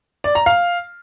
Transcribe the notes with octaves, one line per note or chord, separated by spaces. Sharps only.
D5
A#5
F5